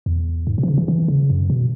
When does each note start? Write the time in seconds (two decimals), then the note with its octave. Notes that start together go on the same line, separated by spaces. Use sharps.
0.06 E2
0.47 G#2
0.58 B2
0.63 E3
0.68 C#3
0.78 E3
0.88 E3
1.08 C#3
1.30 F#2
1.50 B2